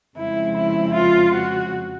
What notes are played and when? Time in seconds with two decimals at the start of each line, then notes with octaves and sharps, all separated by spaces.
0.17 F2 C#3 F3 G#3 C4 E4
0.56 E4
0.94 F4
1.32 F#4